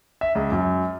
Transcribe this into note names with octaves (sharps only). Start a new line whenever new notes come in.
E5
C#2
F#2